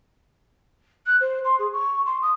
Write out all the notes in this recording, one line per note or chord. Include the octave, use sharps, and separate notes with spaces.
F#6
C5
C6
G#4
C#6
C6
D#6